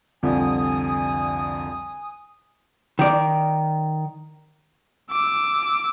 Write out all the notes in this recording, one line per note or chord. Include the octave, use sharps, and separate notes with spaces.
C2 F2 D3 G#5 D#6
D#3 D5
D6 E6